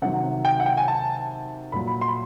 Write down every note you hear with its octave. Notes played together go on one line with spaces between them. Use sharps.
C3 D#3 F#3 F#5
G5
F#5
G5
G#5
A5
A#2 F#3 B5
B5
C6
B5